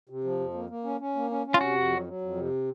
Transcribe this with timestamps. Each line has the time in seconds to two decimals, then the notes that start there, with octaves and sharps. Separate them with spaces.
0.09 C3
0.24 F3
0.40 F2
0.54 A#3
0.69 A#3
0.84 C#4
1.00 C#4
1.16 A#3
1.30 C#4
1.46 C#4
1.54 F4
1.60 C3 F#4
1.75 F2
1.91 F#3
2.07 F#3
2.21 F2
2.36 C3